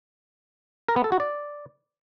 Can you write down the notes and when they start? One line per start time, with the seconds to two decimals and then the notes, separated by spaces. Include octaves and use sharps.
0.88 A#4
0.96 B3
1.04 A4
1.12 F#4
1.20 D5